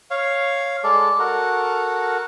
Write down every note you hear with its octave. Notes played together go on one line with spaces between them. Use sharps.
C#5 F5
G#3 A4 D5
F#4 A4 A#4